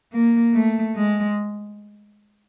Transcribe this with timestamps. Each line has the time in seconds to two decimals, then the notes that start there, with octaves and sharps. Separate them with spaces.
0.12 A#3
0.54 A3
0.95 G#3